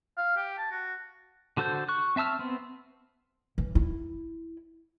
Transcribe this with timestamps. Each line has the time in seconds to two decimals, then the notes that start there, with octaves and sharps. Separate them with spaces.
0.17 F5
0.37 G4
0.58 A5
0.71 F#4
1.57 D3 F#4 A4 C5 G6
1.89 C#6 F#6
2.16 C4 E5 A5 E6 F6
2.39 B3 C4
3.58 E3
3.75 E4